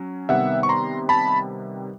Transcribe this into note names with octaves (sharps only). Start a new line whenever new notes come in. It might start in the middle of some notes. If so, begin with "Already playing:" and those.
Already playing: F#3 C#4
C3 D#3 G3 B3 E5 F#5
C#6
A#5 C6
A5 B5